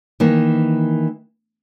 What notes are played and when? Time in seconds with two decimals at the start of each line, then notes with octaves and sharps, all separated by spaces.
0.20 D#3 E3 A#3